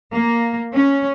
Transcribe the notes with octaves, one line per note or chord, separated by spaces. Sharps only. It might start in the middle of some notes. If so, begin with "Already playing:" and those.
A#3
C#4